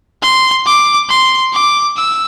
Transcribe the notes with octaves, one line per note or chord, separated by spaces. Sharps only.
C6
D6
C6
D6
E6